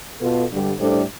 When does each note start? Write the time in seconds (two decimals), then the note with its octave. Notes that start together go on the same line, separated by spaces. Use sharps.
0.21 B2 B3 F4 A4
0.51 G2 D3 G3
0.79 A2 G3 D4 A4 C5